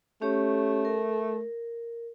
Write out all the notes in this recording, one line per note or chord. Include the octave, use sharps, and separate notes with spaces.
A3 C#4 G4 C#5
A#4